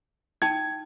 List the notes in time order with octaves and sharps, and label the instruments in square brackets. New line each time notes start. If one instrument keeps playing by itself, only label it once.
[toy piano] D#4 G5 A5 [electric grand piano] G#6